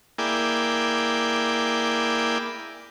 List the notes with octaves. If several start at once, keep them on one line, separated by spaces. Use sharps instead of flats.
A#3 E4 G#4 D5 G5